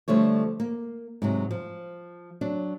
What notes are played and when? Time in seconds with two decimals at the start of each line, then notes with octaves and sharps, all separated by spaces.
0.08 D3 F3 G3 A3 C#5
0.60 A#3
1.22 G#2 C3 F#3
1.51 F3
2.41 F#3 D4